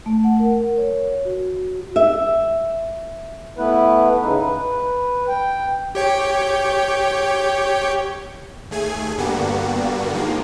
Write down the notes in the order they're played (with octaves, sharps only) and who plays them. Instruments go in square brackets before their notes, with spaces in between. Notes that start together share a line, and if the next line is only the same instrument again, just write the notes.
[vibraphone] A3
F#5
A#4
C#5
F#4
[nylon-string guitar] E5
[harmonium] A3 B3 E4 B4
C#3 D#4 B4
B4
G5
[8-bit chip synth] G4 C#5 G5
[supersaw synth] D#2 A3 G#4 G#5
G2 D3 G3 A#3 B3 F#4
D#3 F3 G#3 A#3